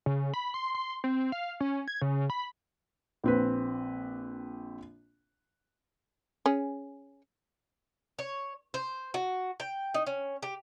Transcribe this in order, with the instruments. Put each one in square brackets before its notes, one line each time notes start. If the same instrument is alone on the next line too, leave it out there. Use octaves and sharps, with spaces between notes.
[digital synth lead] C#3
B5
C6
C6
C4
F5
C#4
G#6
C#3
B5
[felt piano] A#1 C4 B4
[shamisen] C#4 G#4
[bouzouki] C#5
C5
F#4
G5
D#4
C#4
G4